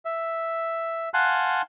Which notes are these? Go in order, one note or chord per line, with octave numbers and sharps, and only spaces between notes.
E5
F5 F#5 G#5 A5 C6 F#6